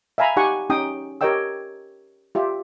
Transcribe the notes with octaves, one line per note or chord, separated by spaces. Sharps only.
E5 F5 G#5 A#5 B5
D#4 G4 F#5 G#5 C#6
C#4 D#4 G4 G5 D#6
G4 A#4 C#5 D#5 G5 E6
F4 G4 E5